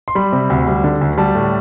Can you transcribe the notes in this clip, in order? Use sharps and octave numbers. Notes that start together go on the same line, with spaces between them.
C6
G3 B5
C3
D2
G3
D3
D2
G3 A5
A2